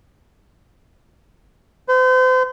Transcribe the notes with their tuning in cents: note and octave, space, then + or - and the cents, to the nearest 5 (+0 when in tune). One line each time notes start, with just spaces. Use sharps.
C5 -40